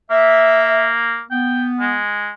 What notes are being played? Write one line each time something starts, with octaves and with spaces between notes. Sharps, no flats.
A#3 E5
B3 G5
G#3